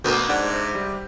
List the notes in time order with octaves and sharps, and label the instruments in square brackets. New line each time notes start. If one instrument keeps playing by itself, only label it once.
[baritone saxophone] D2 [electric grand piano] B2 A#4 G6 [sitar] A#3 B3
[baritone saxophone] G#2 [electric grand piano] D4 D5 F#5
[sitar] C3
[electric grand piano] G3